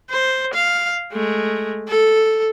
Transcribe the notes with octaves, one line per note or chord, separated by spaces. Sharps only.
C5
F5
G#3 A3
A4